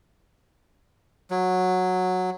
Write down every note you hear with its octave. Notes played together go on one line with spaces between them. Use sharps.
F#3